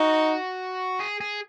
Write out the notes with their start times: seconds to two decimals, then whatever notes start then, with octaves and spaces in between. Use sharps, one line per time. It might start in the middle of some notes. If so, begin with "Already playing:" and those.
Already playing: D#4 F#4
1.00 G#4
1.21 G#4